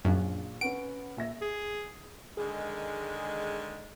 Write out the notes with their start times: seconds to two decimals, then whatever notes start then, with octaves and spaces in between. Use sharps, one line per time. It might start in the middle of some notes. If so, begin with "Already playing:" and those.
0.05 A#1 F#2 D4 F5
0.61 C#4 B4 F#5 D7
1.17 A#2 E5 A#6
1.42 G#4
2.37 D3 D#3 G#3 G#4